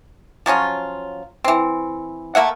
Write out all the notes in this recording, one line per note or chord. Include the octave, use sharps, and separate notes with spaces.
F3 F#3 C#4 F4
E3 C4
A3 A#3 E5 F#5